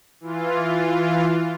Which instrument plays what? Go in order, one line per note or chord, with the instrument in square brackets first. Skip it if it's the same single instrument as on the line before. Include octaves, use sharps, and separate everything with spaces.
[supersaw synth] E3 F4